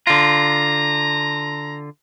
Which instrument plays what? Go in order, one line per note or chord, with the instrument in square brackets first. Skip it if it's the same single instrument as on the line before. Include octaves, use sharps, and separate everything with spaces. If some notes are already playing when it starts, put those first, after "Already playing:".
[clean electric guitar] D3 F4 [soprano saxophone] A#5